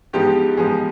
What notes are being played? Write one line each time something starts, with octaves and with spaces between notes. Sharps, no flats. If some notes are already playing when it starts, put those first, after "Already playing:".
G#2 F3 G#3 B3 G4
G#2 F3 G#3 B3 G#4